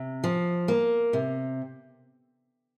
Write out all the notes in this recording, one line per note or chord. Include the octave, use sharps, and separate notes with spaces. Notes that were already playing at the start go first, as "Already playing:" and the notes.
Already playing: C3
F3
A#3
C3